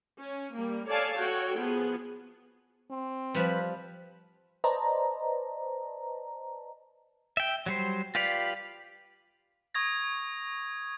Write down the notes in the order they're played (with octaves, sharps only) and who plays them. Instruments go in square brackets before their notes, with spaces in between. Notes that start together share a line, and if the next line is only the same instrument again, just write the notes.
[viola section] C#4
G3 A#3
A4 C#5 D5 F5 G#5 A5
F#4 A4 C#5 G5
F3 B3 G#4
[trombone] C4
[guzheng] F3 G3 [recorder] B4
[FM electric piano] B4 C5 D5 D#5 A5 A#5
[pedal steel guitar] E5 G5
F#3 G3 C5
F4 G4 B4 D5 F5
[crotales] C#6 D#6 G#6 A#6